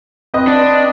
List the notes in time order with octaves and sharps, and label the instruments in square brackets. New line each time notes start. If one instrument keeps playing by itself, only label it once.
[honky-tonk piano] C4 B4 D#5
[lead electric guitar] D4